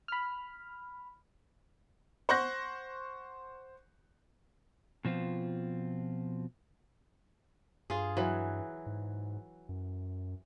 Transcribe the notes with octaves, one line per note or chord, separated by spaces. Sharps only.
B5 F6
C5 F#5 C#6 F#6 G6 A#6
B2 F3 C4 F4
G2 F4 G#4
E3 F#3
G#2
F#2